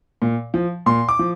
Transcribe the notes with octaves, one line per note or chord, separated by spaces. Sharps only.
A#2
F3
A#2 C6
D6
F3